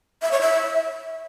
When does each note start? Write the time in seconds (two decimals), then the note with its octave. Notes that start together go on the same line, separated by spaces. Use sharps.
0.22 E5
0.31 C#5
0.41 E5